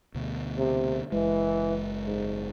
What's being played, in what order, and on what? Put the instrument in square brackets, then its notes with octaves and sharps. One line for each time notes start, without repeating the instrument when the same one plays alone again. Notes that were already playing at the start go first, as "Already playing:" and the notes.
[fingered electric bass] D2 B2
[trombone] C3
[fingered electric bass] F#1 G#3 [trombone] E3
[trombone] G#2